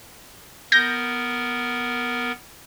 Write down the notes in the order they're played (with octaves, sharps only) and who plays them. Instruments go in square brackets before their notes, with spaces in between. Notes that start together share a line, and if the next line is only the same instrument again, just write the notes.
[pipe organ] B3 A#4 [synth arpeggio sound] G6 A#6